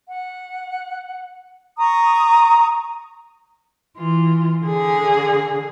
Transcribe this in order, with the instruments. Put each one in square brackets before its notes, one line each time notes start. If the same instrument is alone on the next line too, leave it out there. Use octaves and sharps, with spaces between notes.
[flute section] F#5
A#5 C#6 D#6
[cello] E3 F4
D3 G#4